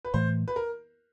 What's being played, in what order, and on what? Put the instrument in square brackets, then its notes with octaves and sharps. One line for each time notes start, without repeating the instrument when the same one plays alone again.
[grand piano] B4
[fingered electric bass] A2 E3 A3 [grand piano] C5
[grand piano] B4
A#4